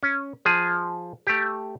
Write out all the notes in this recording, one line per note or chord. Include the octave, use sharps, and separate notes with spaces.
C#4
F3 G#4
A3 G4